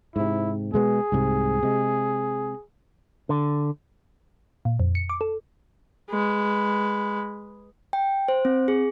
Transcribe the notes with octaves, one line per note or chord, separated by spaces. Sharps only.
G#2 C3 E4
B2 G#3 B3 G#4
C2 G#2 C3
C3 G#3
D3
A#2
F2
C#7
D6
A4
G#3 B4
G5
C5
C4
G#4